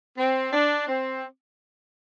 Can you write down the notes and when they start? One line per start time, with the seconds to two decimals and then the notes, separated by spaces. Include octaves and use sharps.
0.18 C4
0.53 D4
0.88 C4